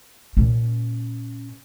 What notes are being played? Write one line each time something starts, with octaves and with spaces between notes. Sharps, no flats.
A#2 C#4